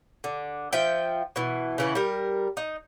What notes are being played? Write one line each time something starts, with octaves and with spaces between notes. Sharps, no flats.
D3
F3 E5 G5
B2 E3
C#3 E3 F#5
G3 A#4
D#4